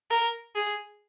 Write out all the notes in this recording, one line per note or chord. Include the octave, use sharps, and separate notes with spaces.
A#4
G#4